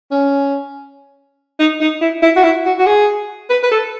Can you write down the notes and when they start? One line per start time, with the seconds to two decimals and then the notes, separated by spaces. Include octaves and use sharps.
0.11 C#4
1.59 D#4
1.81 D#4
2.01 E4
2.22 E4
2.36 F#4
2.43 E4
2.65 F#4
2.78 F#4
2.86 G#4
3.50 B4
3.63 B4
3.71 A4